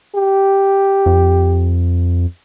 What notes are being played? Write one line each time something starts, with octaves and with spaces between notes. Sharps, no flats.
G4
F2